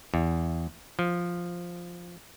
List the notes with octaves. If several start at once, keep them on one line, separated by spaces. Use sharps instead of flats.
E2
F3